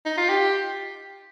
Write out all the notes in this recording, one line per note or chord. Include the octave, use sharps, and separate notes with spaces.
D#4
F4
G4